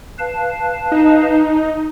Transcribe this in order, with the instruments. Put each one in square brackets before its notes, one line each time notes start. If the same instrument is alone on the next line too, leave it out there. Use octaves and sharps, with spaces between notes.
[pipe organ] B4 F5 A5
[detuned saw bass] D#4